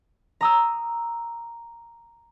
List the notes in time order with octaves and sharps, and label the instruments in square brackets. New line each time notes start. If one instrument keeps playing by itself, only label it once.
[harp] A#5 D#6 E6